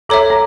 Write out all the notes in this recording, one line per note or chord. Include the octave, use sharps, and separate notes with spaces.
A4 C#5 E5 A#5 D6
A#5